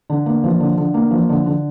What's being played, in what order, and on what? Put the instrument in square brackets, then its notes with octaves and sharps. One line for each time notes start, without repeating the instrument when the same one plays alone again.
[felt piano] D3
A#3
F3
D3
D3
A#3
F3
D3
D3